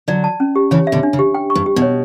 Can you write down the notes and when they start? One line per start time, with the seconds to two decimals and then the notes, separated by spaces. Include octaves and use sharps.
0.08 D3 F#3 D5
0.24 A5
0.40 C#4
0.56 G4
0.71 C#3 E3 C#5
0.87 E5
0.92 B2 D3
1.03 D4
1.13 C#3
1.19 G4
1.34 G5
1.50 C#6
1.55 G2
1.66 G4
1.76 B2
1.82 C#5